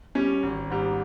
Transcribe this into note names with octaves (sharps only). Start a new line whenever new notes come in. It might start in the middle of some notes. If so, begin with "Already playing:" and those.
G3 C#4
G#1
G#2 G3